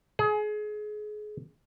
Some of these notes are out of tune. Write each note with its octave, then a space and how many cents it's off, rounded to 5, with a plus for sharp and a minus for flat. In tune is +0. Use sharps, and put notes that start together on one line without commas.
G#4 +30